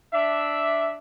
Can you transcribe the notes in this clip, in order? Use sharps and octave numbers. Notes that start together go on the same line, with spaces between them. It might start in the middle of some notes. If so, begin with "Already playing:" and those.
D4 E5